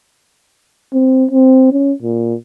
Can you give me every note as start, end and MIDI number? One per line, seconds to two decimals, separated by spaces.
0.93 1.26 60
1.31 1.71 60
1.72 1.93 61
2.03 2.34 46